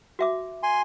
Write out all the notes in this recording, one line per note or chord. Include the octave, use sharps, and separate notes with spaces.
F#4 E5 D6
G#5 C6